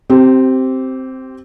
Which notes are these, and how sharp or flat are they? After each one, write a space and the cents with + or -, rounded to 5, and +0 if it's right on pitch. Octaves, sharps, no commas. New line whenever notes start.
C4 +0 G4 -25